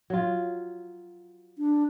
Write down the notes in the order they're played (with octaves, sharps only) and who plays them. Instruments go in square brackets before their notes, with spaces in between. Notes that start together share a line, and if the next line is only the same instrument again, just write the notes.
[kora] F#3 F4
[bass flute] D4